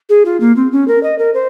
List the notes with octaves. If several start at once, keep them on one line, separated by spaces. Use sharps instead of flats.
G#4
F4
A#3
C4
C#4
A#4
D#5
A#4
C5